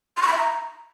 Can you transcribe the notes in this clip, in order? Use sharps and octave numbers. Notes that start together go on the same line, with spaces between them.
C6
C#6
B5
E5
A#5